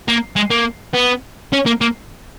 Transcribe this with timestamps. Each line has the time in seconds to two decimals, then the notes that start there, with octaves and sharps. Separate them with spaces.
0.08 A#3
0.36 G#3
0.50 A#3
0.94 B3
1.53 C#4
1.66 A#3
1.81 A#3